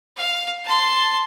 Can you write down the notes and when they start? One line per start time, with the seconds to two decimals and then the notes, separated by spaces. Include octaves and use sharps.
0.17 F5
0.65 A5 C6